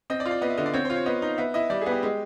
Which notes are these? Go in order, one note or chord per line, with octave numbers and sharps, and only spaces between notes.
C4 D#5
D5
F4
D5
B3 D#5
E5
D3 D#5
D5
C4 C#5
F4 C5
C#5
B3 D#5
D#4
B3 E5
E4 D#5
G3 D5
B3 G#4
G4
G#3